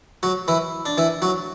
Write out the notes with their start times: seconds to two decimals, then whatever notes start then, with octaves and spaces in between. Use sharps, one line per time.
0.23 F#3 F#4
0.48 E3 E4
0.86 D4
0.98 E3 E4
1.22 F#3 F#4